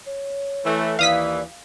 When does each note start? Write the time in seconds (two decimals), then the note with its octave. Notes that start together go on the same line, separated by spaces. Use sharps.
0.06 C#5
0.65 E3 A3
0.99 D#2 E3 D5 F5 D#6 B6